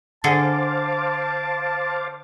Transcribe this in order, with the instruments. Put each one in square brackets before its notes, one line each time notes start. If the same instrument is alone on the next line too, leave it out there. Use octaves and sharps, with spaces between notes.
[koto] D3 G#4 A4 [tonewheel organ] C5 F5 D6 [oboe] A5